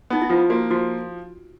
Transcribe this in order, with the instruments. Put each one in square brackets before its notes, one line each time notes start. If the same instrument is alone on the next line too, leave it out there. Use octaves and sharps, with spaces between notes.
[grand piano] B3 [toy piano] D#4
[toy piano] E4
[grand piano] F3 [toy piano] F4
[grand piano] A#3 [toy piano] F#4
[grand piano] F3 [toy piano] F#4